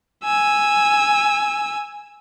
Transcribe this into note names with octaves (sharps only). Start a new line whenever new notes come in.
G#5 E6